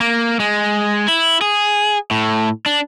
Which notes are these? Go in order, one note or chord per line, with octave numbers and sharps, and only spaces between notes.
A#3
G#3
E4
G#4
A2
D4